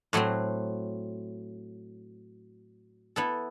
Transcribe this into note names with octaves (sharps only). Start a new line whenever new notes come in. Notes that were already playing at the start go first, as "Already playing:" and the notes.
A2 F#3 A3 C4 F#4
B3 E4 A4